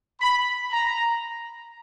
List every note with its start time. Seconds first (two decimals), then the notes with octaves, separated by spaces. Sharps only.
0.20 B5
0.72 A#5